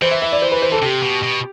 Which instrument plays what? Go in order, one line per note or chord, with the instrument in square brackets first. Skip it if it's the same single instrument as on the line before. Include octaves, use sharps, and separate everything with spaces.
[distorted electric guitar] E3 [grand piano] C5
[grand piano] E5
E5
D5
C5
B4
C5
A4
[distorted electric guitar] C3 [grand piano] G4
[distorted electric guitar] B2
B2